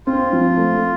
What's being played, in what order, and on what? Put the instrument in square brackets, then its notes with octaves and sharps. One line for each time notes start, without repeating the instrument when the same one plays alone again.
[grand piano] C4 [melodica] F4
[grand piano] F3
A3